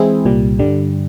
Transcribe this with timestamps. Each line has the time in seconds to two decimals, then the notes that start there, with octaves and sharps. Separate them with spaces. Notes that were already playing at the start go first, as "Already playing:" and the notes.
Already playing: E3 G#3 C4 E4 G#4
0.25 C2 A#2 G3
0.59 G2 D3 G3